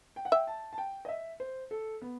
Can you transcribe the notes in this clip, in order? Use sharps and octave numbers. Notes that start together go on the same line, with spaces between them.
G5
F#5
E5 G5
A5
A5
G5
D#5
E5
C5
A4
B3